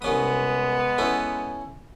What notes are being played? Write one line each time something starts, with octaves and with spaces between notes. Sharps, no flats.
C2 G#3 B3 C#4 D#6
C#4 E4 A4